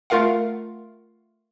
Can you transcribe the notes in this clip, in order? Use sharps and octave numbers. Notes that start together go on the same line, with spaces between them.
A3 F4 A#4 F5 F#5